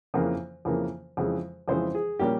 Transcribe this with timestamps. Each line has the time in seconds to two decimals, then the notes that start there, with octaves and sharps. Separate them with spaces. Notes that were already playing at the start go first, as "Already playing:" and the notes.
0.14 F2 C#3 E3 A#3
0.65 F2 C#3 E3 A#3
1.17 F2 C#3 E3 G#3
1.68 F2 C#3 E3 G#3 C5
1.95 G#4
2.19 A#2 G3 A#3 C#4 G4